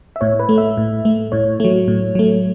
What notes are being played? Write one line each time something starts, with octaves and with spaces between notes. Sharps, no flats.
E5
A2 C#5
B4
A3
E5
A2
A3
A2 C#5
F#3 A3
A2
F#3 A3